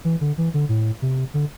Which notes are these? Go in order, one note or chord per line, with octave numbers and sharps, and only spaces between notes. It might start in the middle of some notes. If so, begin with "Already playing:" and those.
E3
D3
E3
D3
A2
C3
D3